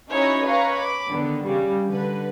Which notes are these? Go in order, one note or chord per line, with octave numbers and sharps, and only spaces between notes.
C#4 D#4 E4 F#4 C#5 D#5
B4 C#5 D#5 F5 A#5
B5 D6
D3 D#3 B3
C#3 G3
D3 B4